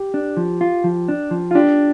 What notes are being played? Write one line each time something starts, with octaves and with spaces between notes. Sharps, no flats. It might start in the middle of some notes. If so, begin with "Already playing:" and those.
Already playing: G4
D4
F3
F4
F3
D4
F3
F4
D4 G4